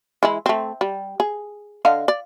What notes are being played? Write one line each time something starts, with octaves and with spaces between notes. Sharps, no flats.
E3 G#3 E4
A3 C4
G3
G#4
D3 D#5 F5
D5